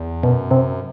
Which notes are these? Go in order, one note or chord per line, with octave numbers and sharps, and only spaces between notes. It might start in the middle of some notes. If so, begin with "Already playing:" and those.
Already playing: E2
F#2 B2
C3